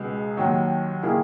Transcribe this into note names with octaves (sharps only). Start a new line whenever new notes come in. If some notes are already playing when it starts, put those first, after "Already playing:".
Already playing: C#2 B2 G#3 B3
D#2 D#3 F#3
D#3 A#3 E4 G#4